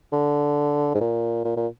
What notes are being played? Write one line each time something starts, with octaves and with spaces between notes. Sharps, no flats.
D3
G#2
A#2
A#2
A#2